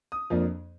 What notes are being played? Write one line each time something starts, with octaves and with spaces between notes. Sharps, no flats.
D#6
F2 F3 A#3 D4